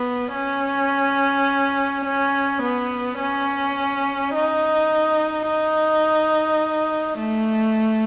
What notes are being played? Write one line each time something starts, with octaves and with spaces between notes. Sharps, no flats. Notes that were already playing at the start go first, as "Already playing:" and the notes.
Already playing: B3
C#4
C#4
B3
C#4
D#4
D#4
A3